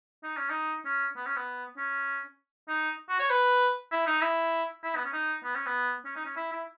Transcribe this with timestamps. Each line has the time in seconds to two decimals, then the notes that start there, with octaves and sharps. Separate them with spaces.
0.23 D#4
0.37 C#4
0.50 D#4
0.85 C#4
1.16 B3
1.26 C#4
1.36 B3
1.77 C#4
2.68 D#4
3.09 F#4
3.19 C#5
3.30 B4
3.91 E4
4.07 D#4
4.21 E4
4.83 E4
4.95 B3
5.05 C#4
5.13 D#4
5.44 B3
5.55 C#4
5.66 B3
6.05 C#4
6.16 D#4
6.25 C#4
6.36 E4
6.52 E4